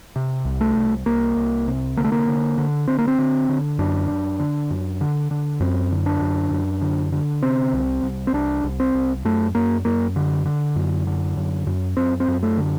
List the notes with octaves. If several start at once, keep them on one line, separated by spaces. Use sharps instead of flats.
C3
C2
A3
C2
C2 A#3
C2
C3
D3 A#3
A3
A#3
D3
D3
D3 C4
A#3
C4
D3
D3
F#2 D4
F#2
D3
F#2
D3
D3
F#2 C4
D3
D4
F#2
F#2
D3
D3
C3 C4
C2
C2
C4
C2 D4
C2
C4
C2
F#2 A3
F#2 A#3
F#2 A#3
D3
D3
F#2
D3
F#2
F#2
F#2 C4
C4
F#2
A3
D3